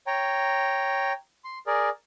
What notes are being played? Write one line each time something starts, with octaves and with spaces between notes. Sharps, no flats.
C#5 G5 A#5
C6
G#4 A#4 D5